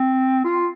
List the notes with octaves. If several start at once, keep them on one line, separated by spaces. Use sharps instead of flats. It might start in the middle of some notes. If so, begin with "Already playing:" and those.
Already playing: C4
F4